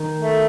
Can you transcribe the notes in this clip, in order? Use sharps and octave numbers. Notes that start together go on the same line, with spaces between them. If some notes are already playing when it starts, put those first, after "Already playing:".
Already playing: D#3
A3